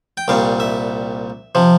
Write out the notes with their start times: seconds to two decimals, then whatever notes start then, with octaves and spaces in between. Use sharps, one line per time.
0.17 G5
0.28 C2 A#2 G3 F5
0.60 E5
1.55 C3 F3